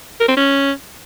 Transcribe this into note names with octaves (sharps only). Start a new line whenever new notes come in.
A#4
C4
C#4